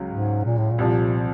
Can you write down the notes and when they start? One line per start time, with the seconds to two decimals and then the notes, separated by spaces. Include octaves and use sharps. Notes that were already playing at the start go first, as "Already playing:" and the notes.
Already playing: C#2 C#3 F#3
0.10 G#2
0.45 A#2
0.58 A2
0.71 A#2
0.78 C2 C3 F3